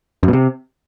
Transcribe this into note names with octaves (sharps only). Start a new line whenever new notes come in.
F#2
B2
C3